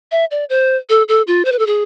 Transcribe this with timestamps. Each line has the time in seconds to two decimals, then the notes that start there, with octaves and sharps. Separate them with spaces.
0.12 E5
0.31 D5
0.49 C5
0.89 A4
1.08 A4
1.27 F4
1.45 C5
1.52 B4
1.59 A4
1.67 G#4